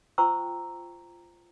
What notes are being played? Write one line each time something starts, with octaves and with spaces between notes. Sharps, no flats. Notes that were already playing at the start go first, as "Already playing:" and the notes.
F4 C5 G5 A#5 C#6 E6